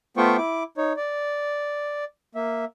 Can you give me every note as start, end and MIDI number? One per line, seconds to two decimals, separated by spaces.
0.17 0.37 57
0.17 0.37 59
0.17 0.37 65
0.17 0.37 72
0.17 0.37 79
0.17 0.37 85
0.38 0.63 64
0.38 0.63 86
0.77 0.93 63
0.77 0.93 73
0.97 2.04 74
2.35 2.65 58
2.35 2.65 76